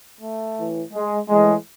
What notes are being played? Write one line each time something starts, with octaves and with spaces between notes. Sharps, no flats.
A3
A2 E3
G#3
A2 E3 G#3